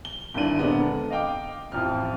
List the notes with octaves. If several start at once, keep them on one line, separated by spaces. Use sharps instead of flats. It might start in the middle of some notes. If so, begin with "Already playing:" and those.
G7
G1 D#2 D4 E4 D#7 F#7
A#2 D3 G#3 B3 C4
A4
D#5 F5 G5 D6
A1 F2 F3 F6